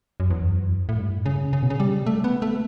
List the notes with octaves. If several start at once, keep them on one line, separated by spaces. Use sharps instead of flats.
F#2
E2
F#2
A2
G2
C#3
C#3
B2
C#3
G3
A3
B3
A3